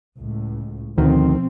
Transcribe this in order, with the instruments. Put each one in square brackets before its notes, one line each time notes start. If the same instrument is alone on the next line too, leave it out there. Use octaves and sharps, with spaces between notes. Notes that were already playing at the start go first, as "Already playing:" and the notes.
[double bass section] C#2 A2
[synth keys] D2 D#3 [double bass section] B2 F3 C4